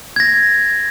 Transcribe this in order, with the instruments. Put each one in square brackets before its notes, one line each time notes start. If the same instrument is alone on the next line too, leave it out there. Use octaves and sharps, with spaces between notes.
[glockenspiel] G#6 A#6